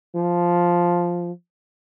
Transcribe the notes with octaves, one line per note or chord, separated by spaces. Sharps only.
F3